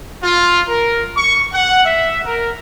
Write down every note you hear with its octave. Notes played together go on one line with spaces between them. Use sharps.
F4
A#4
C#6
F#5
E5
A#4